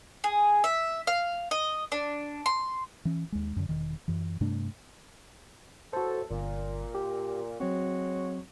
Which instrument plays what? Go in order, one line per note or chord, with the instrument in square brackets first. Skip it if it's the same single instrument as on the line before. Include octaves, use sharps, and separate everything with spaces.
[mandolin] G#4
E5
F5
D#5
D4
C6
[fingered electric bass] E3 C#4
D#2 G#3
F#2 D3
E1 D#3
F#2 E3
G2 C3 A3 D4
[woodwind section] E2 A2 A4 [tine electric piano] F#4 C5
[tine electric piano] G1 [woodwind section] A#2
[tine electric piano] G4
[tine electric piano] F#3 C4 [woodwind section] G#3 F#4 C#5